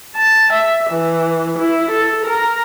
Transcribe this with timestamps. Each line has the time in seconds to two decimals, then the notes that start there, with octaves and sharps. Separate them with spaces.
0.17 A5
0.54 E5
0.91 E3
1.58 E4
1.90 A4
2.26 A#4